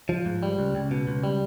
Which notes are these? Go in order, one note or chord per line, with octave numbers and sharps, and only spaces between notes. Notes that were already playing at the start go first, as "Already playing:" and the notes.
F3
G#2
G3
C#2
C#2
B2
C#2
G3